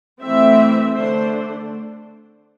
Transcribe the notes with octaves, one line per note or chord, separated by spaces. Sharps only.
E3 A3 C4 E5
D3 A3 D4 C5